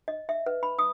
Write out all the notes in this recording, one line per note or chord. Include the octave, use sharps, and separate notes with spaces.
D#5
E5
B4
B5
D#6